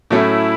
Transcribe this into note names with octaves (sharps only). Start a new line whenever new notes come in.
A2 F#3 A3 C#4 E4